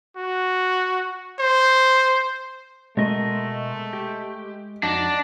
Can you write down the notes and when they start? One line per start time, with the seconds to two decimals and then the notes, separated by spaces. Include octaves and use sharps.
0.17 F#4
1.39 C5
2.97 B2 G#3 A3 A#4 D#5
3.93 G4
4.83 F2 D4 D#4 F#4